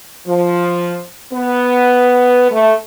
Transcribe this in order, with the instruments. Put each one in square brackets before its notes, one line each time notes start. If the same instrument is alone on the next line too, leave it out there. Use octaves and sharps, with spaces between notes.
[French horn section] F3
B3
A3